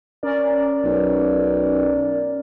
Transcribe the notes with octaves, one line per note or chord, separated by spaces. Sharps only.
C#4 A#4 D5
B1